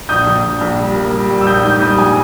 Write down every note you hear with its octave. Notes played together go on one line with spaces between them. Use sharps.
A#1 D#6 G6
A#1
A#1
A#1
G3
A#3
G3
G3
E6
A#1 D#6 G6
G#2 D#6 G6
G3 D#6 G6
A#1 G#5